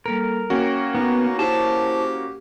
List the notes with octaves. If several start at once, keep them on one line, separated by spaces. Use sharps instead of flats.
G3 A#3 A4 A#4
A#3 C#4 F#4 G5
B3 D#4
E4 G4 C5 A5